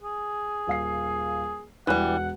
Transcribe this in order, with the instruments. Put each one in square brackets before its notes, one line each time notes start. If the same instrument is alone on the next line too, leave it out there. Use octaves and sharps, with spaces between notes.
[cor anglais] G#4
[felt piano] D#1 F5 C7
[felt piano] E1 F#6 [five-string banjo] E3 G3 [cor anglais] F#5